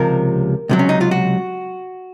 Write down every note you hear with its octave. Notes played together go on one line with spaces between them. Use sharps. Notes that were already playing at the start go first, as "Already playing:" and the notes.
Already playing: C#2 C3 F3 A#4
C#2 C3 F#3
C#4
D#4
F4
F#4